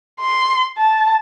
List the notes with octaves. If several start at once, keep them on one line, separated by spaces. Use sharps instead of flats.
C6
A5